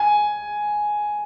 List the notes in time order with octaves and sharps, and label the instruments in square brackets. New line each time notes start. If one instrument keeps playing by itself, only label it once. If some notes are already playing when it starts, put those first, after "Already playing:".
Already playing: [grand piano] G#5